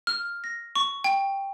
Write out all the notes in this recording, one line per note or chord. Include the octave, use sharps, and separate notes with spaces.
F6
A#6
C#6
G5